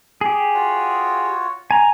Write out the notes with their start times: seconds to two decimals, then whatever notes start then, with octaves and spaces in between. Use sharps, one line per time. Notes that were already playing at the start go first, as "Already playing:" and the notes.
0.21 G4 G#4
0.54 F4 F#4 C#5
1.71 G#5 A#5